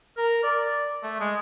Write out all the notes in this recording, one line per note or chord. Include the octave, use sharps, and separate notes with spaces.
A#4
D5
A3
G#3